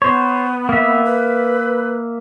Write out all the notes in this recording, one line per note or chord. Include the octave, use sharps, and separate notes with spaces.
B3 C5 C#5
A#3 E5
B4